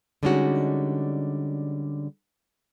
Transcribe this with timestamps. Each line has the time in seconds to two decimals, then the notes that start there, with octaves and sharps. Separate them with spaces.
0.23 D3 G3 G#3 C#4 D#4 F#4